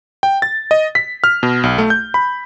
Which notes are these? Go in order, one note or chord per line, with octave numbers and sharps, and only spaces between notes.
G5
A6
D#5
B6
F6
B2
B1
A3
G6
B5